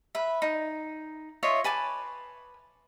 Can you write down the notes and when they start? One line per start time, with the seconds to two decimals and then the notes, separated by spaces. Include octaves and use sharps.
0.15 B4 E5
0.42 D#4
1.43 F4 C#5 D#5 E5
1.64 B4 G#5 A5 D6